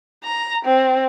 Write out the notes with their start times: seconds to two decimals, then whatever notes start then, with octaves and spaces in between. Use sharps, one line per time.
0.24 A#5
0.65 C4